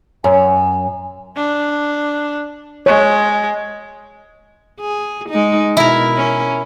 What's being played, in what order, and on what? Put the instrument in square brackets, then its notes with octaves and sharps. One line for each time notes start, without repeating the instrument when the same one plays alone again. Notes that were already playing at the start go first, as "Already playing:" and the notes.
[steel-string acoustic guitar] F#2 [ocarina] G#5
[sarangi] D4
[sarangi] G#3 [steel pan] C#5
[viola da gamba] G#4
G#3 D#4
[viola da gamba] B2 [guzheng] E4 A#4
[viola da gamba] C#4